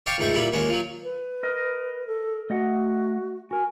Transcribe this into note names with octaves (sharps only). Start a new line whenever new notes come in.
C#5 F5 G5 A5 C#6 D6
C#2 G#2 A3 G5 C#6
A#2 G3 E4 F4
D#2 G#3 A#3 C#4
F3 F#3
B4
A#4 D#5
A4
A3 F#4 D#5 F#5
F#4 A#4 G#5